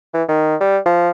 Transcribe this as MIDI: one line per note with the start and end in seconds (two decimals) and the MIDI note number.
0.14 0.23 52
0.28 0.55 51
0.61 0.78 55
0.86 1.10 53